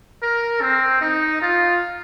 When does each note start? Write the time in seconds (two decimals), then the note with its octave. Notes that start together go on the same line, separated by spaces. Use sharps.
0.22 A#4
0.61 C4
1.01 D#4
1.42 F4